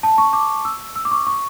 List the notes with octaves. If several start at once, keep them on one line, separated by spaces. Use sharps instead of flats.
A5
C#6
D6
E6
E6
D6
C#6
C#6